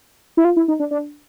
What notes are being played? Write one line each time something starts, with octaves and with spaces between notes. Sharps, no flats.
E4
F4
E4
D#4
D4
D4